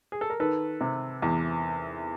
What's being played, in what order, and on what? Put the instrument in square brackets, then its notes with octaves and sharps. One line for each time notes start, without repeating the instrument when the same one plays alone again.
[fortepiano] G#4
A4
A#4
D#3 A4 B4
C3
E2